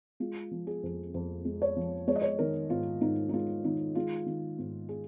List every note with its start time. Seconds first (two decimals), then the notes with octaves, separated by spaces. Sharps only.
0.20 G#3 F4
0.51 F3
0.67 G#4
0.83 F2
1.14 F2
1.45 G#3
1.62 C#5
1.77 F3
2.08 G#3 C#5
2.16 D#5
2.22 C#5
2.39 D#3 A#4
2.70 G#2 F4
3.01 G#2 D#4
3.29 D#4
3.33 G#3 F4
3.64 D#3 D#4
3.95 G#3 F4
4.26 D#3
4.59 G#2
4.89 G#4